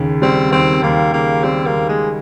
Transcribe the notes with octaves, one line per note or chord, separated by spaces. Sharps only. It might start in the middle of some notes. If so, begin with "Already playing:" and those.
Already playing: D#2 C#3
G3 C4
D#2 C4
D#2 A#3
C#3 A#3
G3 C4
A#3
D#2
G#3